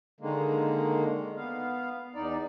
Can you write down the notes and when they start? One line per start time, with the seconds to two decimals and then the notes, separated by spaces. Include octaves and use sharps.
0.20 D3 D#3 G#3 A#3
1.37 B3 F5
2.15 E2 D#4 D5